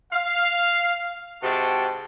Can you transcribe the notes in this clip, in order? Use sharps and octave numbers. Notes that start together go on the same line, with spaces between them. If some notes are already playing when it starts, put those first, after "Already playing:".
F5
G#2 C3 F#4 G5 A5